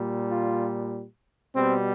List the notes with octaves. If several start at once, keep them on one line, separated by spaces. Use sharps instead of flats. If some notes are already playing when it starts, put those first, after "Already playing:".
Already playing: A#2 G3
F4
B2 G3 C4